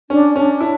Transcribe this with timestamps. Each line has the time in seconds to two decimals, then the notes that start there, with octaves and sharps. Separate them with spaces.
0.10 C#4 D4
0.36 C#4 D4
0.61 E4